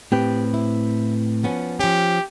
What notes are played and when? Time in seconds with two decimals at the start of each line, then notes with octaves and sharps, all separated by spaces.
0.12 A2 C4 G4 B4
0.54 E4
1.43 F3 B3 C#4
1.80 F3 C#4 G4